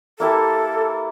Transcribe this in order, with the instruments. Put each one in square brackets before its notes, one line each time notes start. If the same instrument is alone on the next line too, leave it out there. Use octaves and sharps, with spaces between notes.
[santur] A#3 E4 G4 [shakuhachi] A4